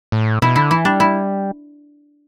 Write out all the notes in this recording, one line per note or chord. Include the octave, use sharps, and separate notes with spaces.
A2
B2 E4
D3 E4
E3 E4
G3 D4
E4